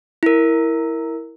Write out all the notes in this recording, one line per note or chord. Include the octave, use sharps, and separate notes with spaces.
E4 A#4